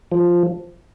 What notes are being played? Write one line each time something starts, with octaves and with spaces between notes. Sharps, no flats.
F3